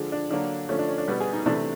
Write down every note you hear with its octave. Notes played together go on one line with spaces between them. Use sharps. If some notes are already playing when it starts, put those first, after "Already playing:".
Already playing: D3 F3 G#3
D4
D3 F#3 A#3 D4
D3 F3 A3 C#4
D4
C#4
D4
B2 G3 B3
G#4
D#4
C3 E3 A3 D4